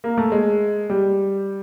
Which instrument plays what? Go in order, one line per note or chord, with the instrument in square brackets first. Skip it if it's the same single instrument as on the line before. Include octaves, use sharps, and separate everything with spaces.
[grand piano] A#3
A3
G#3
G3